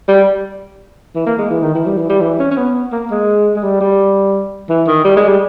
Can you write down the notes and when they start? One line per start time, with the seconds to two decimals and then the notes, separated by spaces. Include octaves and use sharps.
0.08 G3
1.15 E3
1.26 A#3
1.38 G#3
1.51 E3
1.62 D#3
1.75 E3
1.86 G3
1.97 E3
2.09 G3
2.21 E3
2.39 C#4
2.51 C#4
2.57 B3
2.92 A#3
3.10 G#3
3.56 G#3
3.63 G3
3.81 G3
4.69 E3
4.87 D#3
5.04 G3
5.17 G#3
5.28 G3